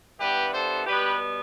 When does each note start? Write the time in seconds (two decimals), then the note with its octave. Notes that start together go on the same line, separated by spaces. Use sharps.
0.19 G2 E3 G3 B3 G4 B4
0.53 A4 C5
0.86 B2 G3 B3 G4 B4